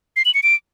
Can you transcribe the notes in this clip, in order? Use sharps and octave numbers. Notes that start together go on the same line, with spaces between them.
C7
F#7
C#7
D7